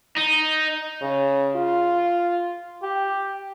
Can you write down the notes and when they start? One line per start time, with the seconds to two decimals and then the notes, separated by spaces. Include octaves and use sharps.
0.18 D#4
1.02 C#3
1.55 F4
2.82 G4